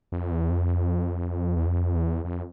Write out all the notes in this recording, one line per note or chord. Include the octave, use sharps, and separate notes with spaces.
F2
E2
F2
E2
F2
E2
F2